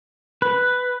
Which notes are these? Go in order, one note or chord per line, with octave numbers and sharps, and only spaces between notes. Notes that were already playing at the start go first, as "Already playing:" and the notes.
B4